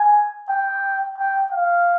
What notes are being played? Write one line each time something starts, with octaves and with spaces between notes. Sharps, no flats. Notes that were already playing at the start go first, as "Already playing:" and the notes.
Already playing: G#5
G5
G5
F5